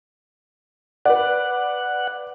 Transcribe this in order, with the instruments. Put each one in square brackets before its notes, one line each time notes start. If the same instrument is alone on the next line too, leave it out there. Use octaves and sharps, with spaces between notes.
[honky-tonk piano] B4 D5 [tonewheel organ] F#5